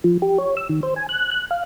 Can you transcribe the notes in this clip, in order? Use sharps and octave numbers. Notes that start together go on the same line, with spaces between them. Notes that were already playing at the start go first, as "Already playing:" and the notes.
F3
G4
C#5
E6
D#3
C5
G#5
F#6
F#6
F5